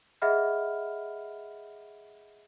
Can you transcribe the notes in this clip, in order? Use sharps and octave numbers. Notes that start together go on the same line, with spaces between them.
G#4 D#5 E5 F#5 B5 F6